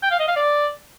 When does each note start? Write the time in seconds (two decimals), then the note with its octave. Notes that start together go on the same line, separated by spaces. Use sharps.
0.03 G5
0.11 F5
0.20 D#5
0.28 F5
0.36 D5